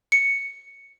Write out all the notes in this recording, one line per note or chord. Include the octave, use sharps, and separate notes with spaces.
C#7